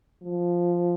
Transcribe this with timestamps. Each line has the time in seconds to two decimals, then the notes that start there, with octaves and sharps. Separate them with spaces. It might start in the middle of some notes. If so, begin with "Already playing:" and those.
0.23 F3